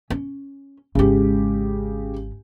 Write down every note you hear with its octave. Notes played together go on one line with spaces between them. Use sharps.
C#4
G#1 C#3 G#3 G4